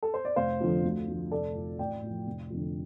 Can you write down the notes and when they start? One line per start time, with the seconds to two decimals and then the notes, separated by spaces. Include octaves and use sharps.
0.03 A4
0.14 C5
0.25 D5
0.36 F1 C5 F5
0.60 F2 D3 F3
0.84 D2
1.08 D3 F3
1.31 F1 A4 D5
1.55 F2 F3
1.79 A1 D5 G5
2.02 A2 F3
2.26 F1
2.50 F2 D3